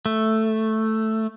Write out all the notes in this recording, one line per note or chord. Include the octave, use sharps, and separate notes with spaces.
A3